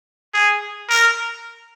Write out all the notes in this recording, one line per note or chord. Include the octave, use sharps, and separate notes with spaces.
G#4
A#4